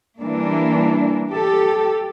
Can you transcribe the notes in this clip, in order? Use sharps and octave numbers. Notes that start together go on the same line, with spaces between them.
E3 G3 A#3 D4
G4 A4